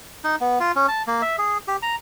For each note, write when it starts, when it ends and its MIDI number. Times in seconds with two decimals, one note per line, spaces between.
0.24 0.36 63
0.40 0.59 59
0.60 0.72 65
0.76 0.87 61
0.88 1.03 81
1.07 1.22 58
1.22 1.36 76
1.38 1.58 68
1.68 1.77 67
1.82 1.95 82